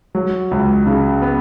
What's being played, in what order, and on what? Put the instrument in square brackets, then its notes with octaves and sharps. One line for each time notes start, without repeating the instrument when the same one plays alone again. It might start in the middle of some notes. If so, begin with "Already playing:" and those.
[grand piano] F#3
C#2
C#3
B3